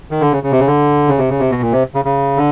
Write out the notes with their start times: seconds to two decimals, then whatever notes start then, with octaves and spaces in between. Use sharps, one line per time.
0.11 D#3
0.21 D3
0.32 C#3
0.43 C#3
0.52 C3
0.60 C#3
0.67 D3
1.08 C#3
1.18 C3
1.30 C#3
1.40 C3
1.50 B2
1.62 A#2
1.72 C3
1.95 C#3
2.05 C#3
2.37 D3